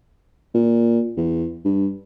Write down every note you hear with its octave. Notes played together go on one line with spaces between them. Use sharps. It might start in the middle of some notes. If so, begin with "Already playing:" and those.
A#2
E2
G2